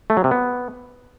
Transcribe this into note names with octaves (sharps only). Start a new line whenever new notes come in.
A3
F#3
C3
B3